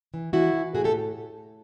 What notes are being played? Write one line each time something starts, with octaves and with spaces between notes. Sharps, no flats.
E3
E3 E4 F#4
E3
A2 F#4 G#4
G4 A4